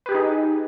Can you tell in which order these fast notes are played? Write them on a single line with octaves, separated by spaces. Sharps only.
B4 G4 G#4 D#4